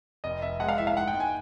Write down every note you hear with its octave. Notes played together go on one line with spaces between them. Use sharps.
F1 D#5
F1 E5
G#3 F#5
F5
E3 E5
F5
G#2 F#5
G5
G#2
G#5